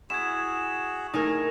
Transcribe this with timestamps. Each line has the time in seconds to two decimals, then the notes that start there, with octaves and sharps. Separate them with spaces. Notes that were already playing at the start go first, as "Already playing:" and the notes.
0.10 E4 F#4 G#4 G#6 E7
1.14 A2 D#4 G#4 A#4